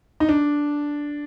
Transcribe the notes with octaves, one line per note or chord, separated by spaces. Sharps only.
D#4
D4